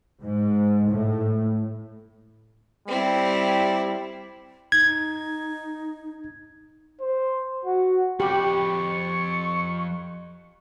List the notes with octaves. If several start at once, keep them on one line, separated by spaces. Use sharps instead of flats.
G#2
A2
G3 C4 E4
D#4 G#6
C5
F#4
F2 G4 B5 C#6